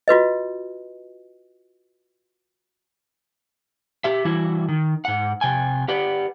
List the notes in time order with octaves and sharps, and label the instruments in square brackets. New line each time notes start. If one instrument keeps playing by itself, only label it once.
[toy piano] F4 F#4 B4 D#5
[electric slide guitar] G4 E5
E3 G3 E4 F#4
D#3
G#2 F#5
C3 G5 G#5
G4 B4 D5 F#5